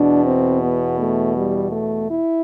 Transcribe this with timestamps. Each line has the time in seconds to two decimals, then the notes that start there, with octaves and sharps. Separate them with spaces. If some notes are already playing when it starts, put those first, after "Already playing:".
Already playing: E2 B2 D4
0.24 C4
0.61 B3
0.98 A3
1.33 G3
1.70 A3
2.06 E4